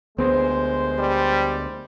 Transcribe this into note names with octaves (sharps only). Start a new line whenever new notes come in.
D2 G#3 B3 C5
G3